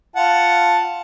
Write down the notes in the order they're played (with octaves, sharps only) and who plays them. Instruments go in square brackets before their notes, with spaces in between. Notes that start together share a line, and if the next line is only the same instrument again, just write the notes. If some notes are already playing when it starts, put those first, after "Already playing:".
[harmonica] F4 F#5 A5